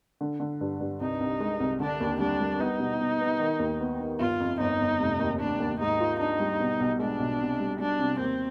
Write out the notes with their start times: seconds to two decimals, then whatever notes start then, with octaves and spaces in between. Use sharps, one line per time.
0.21 D3
0.40 D3
0.61 G2
0.80 G2
1.01 C2 D#4
1.20 C2
1.40 G#3
1.60 C2
1.80 D3 D4
2.00 D#2
2.20 G3 D4
2.40 G3
2.60 B3 D#4
2.80 B2
3.00 B2
3.20 B3
3.39 D#3
3.60 D#2
3.80 B3
4.00 D#3
4.20 G1 F4
4.40 F2
4.60 G1 D#4
4.80 G1
5.00 F1
5.19 D#2
5.40 F1 D4
5.60 D#2
5.80 G#2 D#4
6.00 F4
6.20 D4 D#4
6.40 G3
6.60 B2
6.80 B1
6.99 G#3 D4
7.19 B1
7.40 C3
7.59 G3
7.79 G3 D4
7.99 C3
8.19 D#2 C4